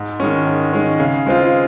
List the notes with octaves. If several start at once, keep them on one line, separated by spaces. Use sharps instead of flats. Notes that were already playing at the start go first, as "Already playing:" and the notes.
Already playing: G#2
D#3 G#3 C#4
G#2
D#3 G#3 C#4
C#3
G#3 C4 F4